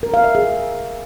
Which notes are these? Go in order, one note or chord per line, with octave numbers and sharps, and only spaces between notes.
A#4
F5
E5
G#4